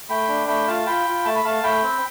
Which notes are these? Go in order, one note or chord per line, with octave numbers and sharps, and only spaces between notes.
A3 G5 B5
D4
A3 G5 B5
F4 F5 A5
F4 G5 B5
F4
A3 A5
B5
A3 F5 A5
A3 G5 B5
C4